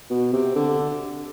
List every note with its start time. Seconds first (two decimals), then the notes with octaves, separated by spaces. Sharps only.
0.10 B2
0.33 C3
0.55 D3